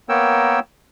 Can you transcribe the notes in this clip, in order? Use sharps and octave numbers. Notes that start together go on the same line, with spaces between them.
A#3 B3 A#4 C#5 G5 E6